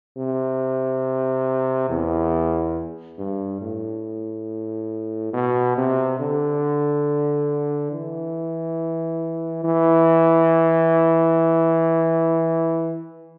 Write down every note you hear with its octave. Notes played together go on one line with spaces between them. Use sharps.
C3
E2
G2
A2
B2
C3
D3
E3
E3